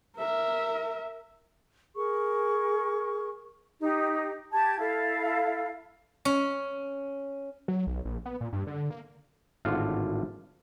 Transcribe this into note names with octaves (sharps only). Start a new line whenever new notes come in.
A#4 E5
G#4 A#4 C#6
D#4 G4
G4 A5 G#6
E4 A4 F5
C#4
F#3
B1
A#1
B3
A#2
G2
D3
A#3
G#1 A2 D3 F4 F#5